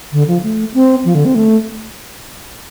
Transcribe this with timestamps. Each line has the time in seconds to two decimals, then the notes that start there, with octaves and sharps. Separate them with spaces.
0.13 D3
0.28 F3
0.43 A3
0.74 C4
1.05 F3
1.15 D3
1.25 C4
1.35 A3